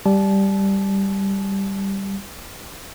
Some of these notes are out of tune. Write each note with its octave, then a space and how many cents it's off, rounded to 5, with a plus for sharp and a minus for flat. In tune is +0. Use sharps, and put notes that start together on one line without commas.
G3 +0 A5 -35